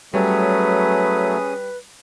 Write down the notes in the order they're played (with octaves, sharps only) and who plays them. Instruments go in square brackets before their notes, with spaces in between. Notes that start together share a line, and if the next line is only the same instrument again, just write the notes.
[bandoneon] F#3 A3 [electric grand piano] G3 C#5 [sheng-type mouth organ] C#4 G#4 D#6 [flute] B4